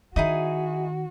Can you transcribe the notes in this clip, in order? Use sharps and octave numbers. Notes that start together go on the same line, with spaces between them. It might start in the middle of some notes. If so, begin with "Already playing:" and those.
D#3 D#4 E4 F#4 G#4